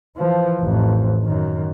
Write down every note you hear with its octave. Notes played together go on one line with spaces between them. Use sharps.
E3 F3
A1 F2
F#2 D#3